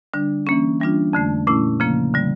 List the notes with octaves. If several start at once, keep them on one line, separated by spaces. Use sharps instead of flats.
D3 G3 D4
E3 A#3 C#4
E3 G3 D4 F4
F2 D3 A3
A#2 A3 C#4 E4
C#3 F3 A#3
D3 G3